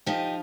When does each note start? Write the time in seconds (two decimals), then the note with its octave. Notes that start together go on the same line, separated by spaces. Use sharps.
0.06 F3 D#4 G4